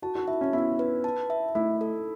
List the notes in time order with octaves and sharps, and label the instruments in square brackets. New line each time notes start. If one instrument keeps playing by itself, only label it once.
[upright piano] F#4 [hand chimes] A5
[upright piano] F#4
[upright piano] E4 [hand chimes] E5
[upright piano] C#4
[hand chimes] B3 [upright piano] E4
[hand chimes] B4
A5
E5
[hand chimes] A3 [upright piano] E4
[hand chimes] A4